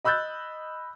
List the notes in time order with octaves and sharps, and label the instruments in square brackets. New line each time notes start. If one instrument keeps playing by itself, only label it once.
[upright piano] D#5 B5 E6 F#6 G6 A6